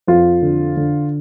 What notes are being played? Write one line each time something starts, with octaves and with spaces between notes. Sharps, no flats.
F2 F4
D3
D3